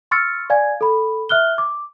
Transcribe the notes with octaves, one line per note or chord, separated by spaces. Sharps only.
C6 C#6 E6 F6 A6 C#7
D5 F5 G#5 G#6
A4 B5
E5 F6 F#6 G7
D6